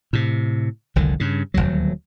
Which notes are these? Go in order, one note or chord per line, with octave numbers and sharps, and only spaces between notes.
A2 C3
F1 C2 D3 D#3
G2 C#3
D#1 G#1 D2 F#3